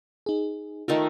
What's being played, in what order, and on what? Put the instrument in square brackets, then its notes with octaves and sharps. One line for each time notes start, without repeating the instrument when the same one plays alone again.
[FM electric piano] D#4 G#4
[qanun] D#3 A3 A#4 [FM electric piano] F4